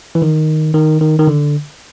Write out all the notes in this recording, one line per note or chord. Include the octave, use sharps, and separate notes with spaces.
E3
D#3
D#3
D#3
D#3
D3